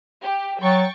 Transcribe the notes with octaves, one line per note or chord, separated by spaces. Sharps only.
G4
F#3 G5 C#6 A6